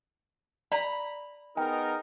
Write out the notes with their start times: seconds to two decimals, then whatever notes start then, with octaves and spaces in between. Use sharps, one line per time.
0.72 D5 A#5 B5
1.57 B3 D#4 G#4 A#4 G5